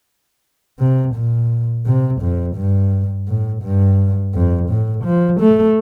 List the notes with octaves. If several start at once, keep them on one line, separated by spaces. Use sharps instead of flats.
C3
A#2
C3
F2
G2
A2
G2
F2
A2
F3
A3